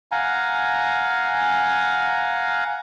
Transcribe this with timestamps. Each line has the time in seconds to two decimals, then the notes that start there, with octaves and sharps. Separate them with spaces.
0.12 F5 F#5 G#5 A#5